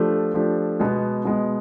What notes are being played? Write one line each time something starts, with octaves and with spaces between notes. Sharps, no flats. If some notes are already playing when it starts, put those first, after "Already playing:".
Already playing: F3 A3 D4 G4
F3 A3 D4 G4
B2 G#3 B3
B2 G#3 B3